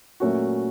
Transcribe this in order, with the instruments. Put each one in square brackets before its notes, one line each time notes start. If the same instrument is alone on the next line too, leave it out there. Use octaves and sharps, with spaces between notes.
[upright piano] A#2 F#3 A3 C#4 F#4